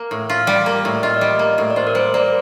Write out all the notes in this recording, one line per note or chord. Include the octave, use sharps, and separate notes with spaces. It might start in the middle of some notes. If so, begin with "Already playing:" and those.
Already playing: A#3
A2
F4 F5
G3
A#3
A2
F4 D#5
D5
G3 D#5
A#3
A2
D5
F4 C5
A#4
G3 C5
A#3 D5